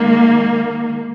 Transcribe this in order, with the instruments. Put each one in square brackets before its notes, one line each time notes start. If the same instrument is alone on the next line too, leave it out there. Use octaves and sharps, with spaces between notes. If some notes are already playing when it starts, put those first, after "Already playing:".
Already playing: [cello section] D#3 G#3 A#3